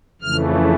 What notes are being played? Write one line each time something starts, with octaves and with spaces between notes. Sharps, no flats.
F2 C#3 E3 A3 F6